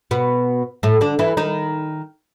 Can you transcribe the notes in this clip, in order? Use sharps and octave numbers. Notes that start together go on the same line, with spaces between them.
B2 B3
A2 A3
D3 D4
E3 E4
D#3 D#4